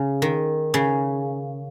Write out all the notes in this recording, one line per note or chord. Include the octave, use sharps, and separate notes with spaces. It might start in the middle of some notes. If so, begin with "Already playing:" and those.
Already playing: C#3
D#3
C#3